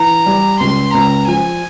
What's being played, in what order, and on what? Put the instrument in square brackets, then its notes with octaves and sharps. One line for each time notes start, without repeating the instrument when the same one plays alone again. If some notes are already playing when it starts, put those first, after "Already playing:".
Already playing: [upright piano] E3 [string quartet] A#5
[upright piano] G3
[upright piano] C#2 [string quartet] C6
[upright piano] C#2 [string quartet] A#5
[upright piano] F3 [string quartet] G#5